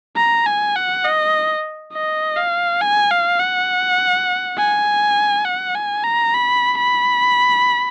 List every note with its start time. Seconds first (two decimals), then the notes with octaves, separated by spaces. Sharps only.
0.17 A#5
0.46 G#5
0.76 F#5
1.05 D#5
1.93 D#5
2.37 F5
2.81 G#5
3.11 F5
3.40 F#5
4.58 G#5
5.45 F#5
5.75 G#5
6.04 A#5
6.34 B5
6.78 B5